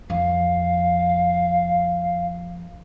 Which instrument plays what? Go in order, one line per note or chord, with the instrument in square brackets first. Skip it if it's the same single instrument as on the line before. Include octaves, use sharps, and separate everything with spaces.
[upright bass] F2 [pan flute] F5